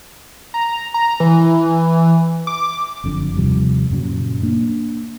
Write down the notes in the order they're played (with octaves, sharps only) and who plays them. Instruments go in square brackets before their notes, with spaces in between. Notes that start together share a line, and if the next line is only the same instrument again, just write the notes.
[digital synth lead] A#5
A#5
E3
D6
[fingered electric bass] F#1 F2 D3
D#2 C3 F3 G3
F#2 A#2 C#3 F#3
A#3 D4